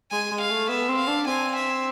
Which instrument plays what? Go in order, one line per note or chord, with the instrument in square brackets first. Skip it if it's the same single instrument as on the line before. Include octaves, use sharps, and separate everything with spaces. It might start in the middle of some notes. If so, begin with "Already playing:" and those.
[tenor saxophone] G#3 [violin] G#5
[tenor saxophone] G#3
[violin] F5
[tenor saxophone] A3
[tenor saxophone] B3 [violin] E5
[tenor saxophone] C4
[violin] F5
[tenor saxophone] D4
[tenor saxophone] C4 [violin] G#5
[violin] E5